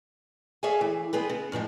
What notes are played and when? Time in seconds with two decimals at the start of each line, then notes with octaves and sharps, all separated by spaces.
0.63 G#4 A4 C#5 E5 F5 G#5
0.81 E3
1.13 B3 C4 G#4 B4
1.30 C#3
1.52 F#2 A2 F3 G#3